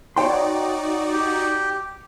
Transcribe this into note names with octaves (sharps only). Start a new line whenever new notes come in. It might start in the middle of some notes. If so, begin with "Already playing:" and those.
D#4 F#4 C#5 D5 G5 C6
G4